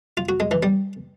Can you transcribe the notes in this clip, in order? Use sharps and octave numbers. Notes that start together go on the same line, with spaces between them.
F4
F#4
G#3
E3
G3